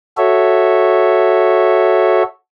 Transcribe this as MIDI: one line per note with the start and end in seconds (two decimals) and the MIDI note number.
0.17 2.23 66
0.17 2.23 69
0.17 2.23 73
0.17 2.23 76